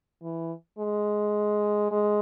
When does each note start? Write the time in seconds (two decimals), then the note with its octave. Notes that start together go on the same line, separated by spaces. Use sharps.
0.23 E3
0.79 G#3
1.91 G#3